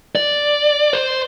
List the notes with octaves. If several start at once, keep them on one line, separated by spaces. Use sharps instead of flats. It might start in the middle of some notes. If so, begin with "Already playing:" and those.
D5
C5